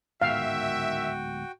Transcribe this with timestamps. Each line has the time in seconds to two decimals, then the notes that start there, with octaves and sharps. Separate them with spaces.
0.22 D1 G#2 D#3 B3 F#4 E5 F5 G5